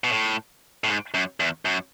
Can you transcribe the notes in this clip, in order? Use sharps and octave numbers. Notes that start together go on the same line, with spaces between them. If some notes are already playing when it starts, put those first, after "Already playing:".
B2
A2
A2
G#2
F#2
E2
F#2